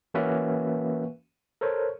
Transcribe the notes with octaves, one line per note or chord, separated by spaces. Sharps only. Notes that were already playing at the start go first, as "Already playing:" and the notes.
E3 A#3 C#4 F#4 B4 E5
A4 A#4 C5 C#5